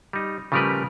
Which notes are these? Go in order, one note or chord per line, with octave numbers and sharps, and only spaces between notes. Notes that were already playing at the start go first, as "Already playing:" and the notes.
G3 D#4
C#3 F3 G3 A3 A#4 B4